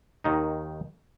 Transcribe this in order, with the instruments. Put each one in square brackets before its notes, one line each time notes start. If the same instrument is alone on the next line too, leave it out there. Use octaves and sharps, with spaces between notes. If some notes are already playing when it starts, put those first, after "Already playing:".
[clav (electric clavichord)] D#2 D#3 D#4